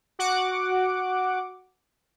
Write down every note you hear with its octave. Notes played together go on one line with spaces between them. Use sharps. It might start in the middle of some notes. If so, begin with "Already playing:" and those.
F#4 F#5 D6